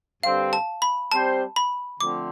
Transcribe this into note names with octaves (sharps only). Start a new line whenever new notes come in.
G2 D3 G3 C4 F5
A5
B5
G3 C4 G4 C5 A5
B5
D3 F3 A3 C4 D6